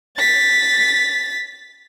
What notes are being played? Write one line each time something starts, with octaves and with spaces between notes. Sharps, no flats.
A6 B6